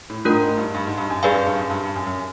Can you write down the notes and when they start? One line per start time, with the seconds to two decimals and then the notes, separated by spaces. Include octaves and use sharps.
0.10 A2
0.25 G#2 A3 D4 F4 A#4
0.41 G#2
0.57 G2
0.74 G2
0.86 G#2
0.97 G2
1.10 F#2
1.23 G2 G#4 B4 D5 F5 G#5
1.34 F#2
1.46 G2
1.59 F#2
1.70 G2
1.83 G2
1.95 F#2
2.06 F#2